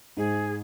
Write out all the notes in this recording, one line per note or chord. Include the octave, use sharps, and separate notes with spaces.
G#2 G#4